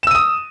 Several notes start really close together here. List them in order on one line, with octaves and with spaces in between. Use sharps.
E7 E6 D#7 D#6